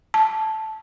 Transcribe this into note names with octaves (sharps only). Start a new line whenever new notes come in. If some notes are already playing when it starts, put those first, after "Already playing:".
A5